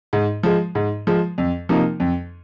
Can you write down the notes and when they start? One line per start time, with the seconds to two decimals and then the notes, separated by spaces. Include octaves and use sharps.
0.13 G#2
0.43 F3 G#3
0.75 G#2
1.07 F3 G#3
1.38 F2
1.69 C3 F3 A#3 D#4
2.00 F2